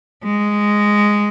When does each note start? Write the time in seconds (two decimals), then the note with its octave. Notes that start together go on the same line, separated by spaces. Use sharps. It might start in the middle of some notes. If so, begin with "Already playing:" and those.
0.24 G#3